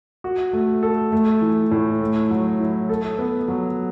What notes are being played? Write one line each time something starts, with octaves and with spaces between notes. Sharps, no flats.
F#4
A3
A4
A3
E3
A2
A3
F#3
E4
A4
B3
F#3